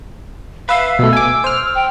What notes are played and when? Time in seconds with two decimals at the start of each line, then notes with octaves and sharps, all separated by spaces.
0.69 B4 E5 F5
0.99 B2 A3 E6
1.13 G#5 D6
1.44 C5 F6
1.75 G5